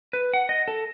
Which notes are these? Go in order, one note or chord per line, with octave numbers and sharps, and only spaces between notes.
B4
F#5
D#5
A4